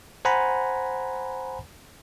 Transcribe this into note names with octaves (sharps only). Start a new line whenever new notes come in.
C5 F#5 G#5 A#5 B5